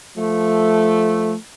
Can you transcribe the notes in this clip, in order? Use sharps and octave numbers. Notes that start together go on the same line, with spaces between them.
F3 A3